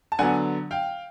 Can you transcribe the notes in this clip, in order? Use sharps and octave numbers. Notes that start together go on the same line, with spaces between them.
A5
D3 F#3 B3 F#5 G#5
F5 G5